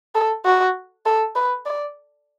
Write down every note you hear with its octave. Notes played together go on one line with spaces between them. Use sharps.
A4
F#4
A4
B4
D5